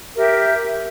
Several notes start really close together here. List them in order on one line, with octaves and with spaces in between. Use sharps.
A#4 G4 E5